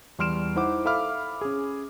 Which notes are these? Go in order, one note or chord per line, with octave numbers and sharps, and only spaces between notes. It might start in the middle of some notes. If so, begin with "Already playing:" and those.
E2 G3 C6 F6 D7 E7
D#4 E4 C5 F#5 D6
A4 E5 F5 B5 D6 F6
C#4 G#4